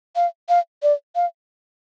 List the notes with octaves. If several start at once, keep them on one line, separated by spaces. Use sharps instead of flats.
F5
F5
D5
F5